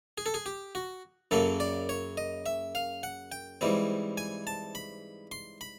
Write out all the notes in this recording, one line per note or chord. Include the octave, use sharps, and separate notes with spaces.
G#4
A4
G#4
G4
F#4
F#2 C#3 F#3 A#3 A4
D5
C#5
D#5
E5
F5
F#5
G5
G#2 E3 G3 C4
G#5
A5
B5
C6
B5